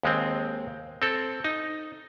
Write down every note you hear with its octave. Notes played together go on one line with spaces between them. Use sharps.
D#2 G#3 C4
C4 A4
D#4